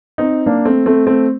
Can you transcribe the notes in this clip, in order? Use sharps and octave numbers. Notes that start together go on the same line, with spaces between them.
C4 D#4
A#3 D4
A3 C4
A3 C4
A3 C4